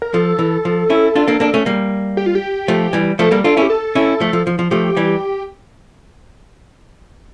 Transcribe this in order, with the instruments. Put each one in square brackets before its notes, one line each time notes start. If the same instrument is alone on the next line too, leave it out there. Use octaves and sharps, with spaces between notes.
[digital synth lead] A#4
[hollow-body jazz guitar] F3 [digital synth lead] A4
[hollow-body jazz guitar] E3
F3
C#4 E4
D4 F4
A#3 D4
A#3 D4
A3 C#4
G3 A#3
[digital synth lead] G4
F4
G4
[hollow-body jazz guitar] F3 A3
E3 G3
[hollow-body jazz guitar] F3 A3 [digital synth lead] A4
[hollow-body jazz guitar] G3 A#3
[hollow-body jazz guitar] D4 F4 [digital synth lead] A4
[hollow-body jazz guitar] C#4 E4
[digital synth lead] G4
A4
[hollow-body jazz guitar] C#4 E4
F3 A3
F3
F3
F3
[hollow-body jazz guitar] F3 A3 [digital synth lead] G4
[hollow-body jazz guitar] E3 G3